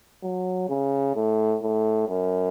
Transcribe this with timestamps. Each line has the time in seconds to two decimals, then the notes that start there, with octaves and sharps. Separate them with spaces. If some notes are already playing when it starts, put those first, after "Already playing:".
0.23 F#3
0.69 C#3
1.15 A2
1.62 A2
2.09 F#2